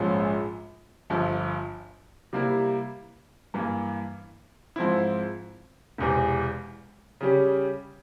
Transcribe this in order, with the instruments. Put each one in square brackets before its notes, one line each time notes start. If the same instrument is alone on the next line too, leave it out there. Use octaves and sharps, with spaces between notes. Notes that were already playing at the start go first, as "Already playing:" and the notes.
Already playing: [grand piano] A#1 G#2 F3 G#3 C#4
G1 G2 F3
C3 G3 A#3 E4
G2 E3 A#3
G#2 F3 C4 E4
E1 E2 C3 E3
C#3 G3 C#4 G4